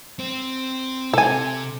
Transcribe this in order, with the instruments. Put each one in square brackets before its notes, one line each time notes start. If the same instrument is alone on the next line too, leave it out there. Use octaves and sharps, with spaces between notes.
[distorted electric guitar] C4
[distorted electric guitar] C3 [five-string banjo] A4 G#5